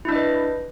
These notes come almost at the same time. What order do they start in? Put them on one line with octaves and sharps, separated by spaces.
E4 D4 D#5 B4